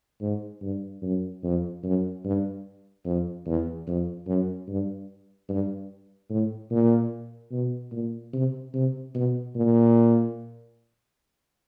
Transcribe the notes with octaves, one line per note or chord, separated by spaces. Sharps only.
G#2
G2
F#2
F2
F#2
G2
F2
E2
F2
F#2
G2
G2
A2
A#2
B2
A#2
C3
C3
B2
A#2